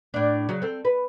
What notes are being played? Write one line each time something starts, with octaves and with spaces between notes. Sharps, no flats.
A2 D4
C#3 F#3
C4 A4
B4